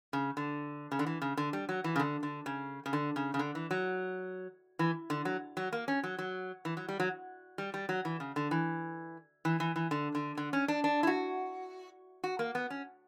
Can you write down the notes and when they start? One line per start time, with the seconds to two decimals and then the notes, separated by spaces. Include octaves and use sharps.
0.13 C#3
0.37 D3
0.92 C#3
0.99 D3
1.06 E3
1.22 C#3
1.37 D3
1.53 G3
1.69 F#3
1.84 E3
1.96 C#3
1.99 D3
2.23 D3
2.46 C#3
2.86 C#3
2.93 D3
3.16 C#3
3.34 C#3
3.39 D3
3.55 E3
3.71 F#3
4.79 E3
5.10 D3
5.25 F#3
5.57 F#3
5.73 A#3
5.88 C#4
6.04 F#3
6.18 F#3
6.65 E3
6.77 F#3
6.89 G3
7.00 F#3
7.58 G3
7.74 G3
7.89 F#3
8.05 E3
8.20 C#3
8.36 D3
8.51 E3
9.45 E3
9.60 E3
9.76 E3
9.91 D3
10.15 D3
10.37 D3
10.53 C#4
10.68 D4
10.84 D4
11.03 E4
11.07 F#4
12.24 F#4
12.39 A#3
12.55 B3
12.70 C#4